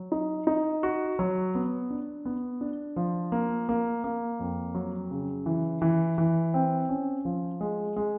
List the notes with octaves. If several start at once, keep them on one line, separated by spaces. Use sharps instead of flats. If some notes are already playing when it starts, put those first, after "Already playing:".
Already playing: F#3
D#4
D#4
F#4
F#3
B3
D4
B3
D4
F3
A#3
A#3
A#3
F2
F#3
C#3
E3
E3
E3
C4
C#4
F3
G#3
G#3